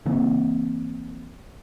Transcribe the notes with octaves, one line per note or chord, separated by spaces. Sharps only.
C#3 E3 A#3 C4